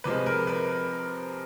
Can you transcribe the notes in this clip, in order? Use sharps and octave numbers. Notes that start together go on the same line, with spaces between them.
C3 F3 G#3 B4
A#4
B4